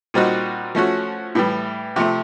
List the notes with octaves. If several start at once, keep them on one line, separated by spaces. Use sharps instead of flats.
A#2 G3 C4 D#4 F#4
F3 A3 C#4 F#4
A2 E3 G3
C3 F3 A3